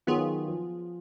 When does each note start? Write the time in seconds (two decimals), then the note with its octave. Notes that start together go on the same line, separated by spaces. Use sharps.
0.07 D#3 F#3 B3 F4 G#4
0.48 F3